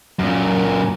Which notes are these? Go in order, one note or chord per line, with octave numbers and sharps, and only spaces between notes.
F#2 A#2